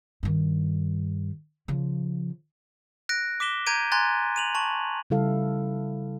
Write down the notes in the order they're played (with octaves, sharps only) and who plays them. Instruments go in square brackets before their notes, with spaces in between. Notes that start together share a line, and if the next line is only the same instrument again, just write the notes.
[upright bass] G2 D#3
C#3 F3
[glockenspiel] F#6 A#6 D7
D6 B6 E7 G7
A#5 G6 G#6 D7 D#7
G#5 A#5 C6 F#6 G#6 A6
D#7 F7 F#7
A5 C#6 F#7
[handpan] C#3 G3 E4 A4 F5